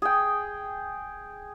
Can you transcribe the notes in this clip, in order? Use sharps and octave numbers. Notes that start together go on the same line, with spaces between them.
G#4 G5